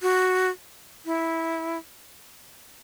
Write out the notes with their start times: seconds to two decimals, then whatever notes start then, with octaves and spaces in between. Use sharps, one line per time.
0.02 F#4
1.06 E4